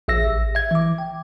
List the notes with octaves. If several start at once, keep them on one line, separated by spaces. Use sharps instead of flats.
A#1 E5 E6 A#6
A1
E5 G#6
E3 D6
G5